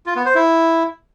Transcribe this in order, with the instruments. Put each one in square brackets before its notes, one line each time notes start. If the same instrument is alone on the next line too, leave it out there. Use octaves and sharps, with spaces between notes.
[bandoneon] F4
B3
C5
E4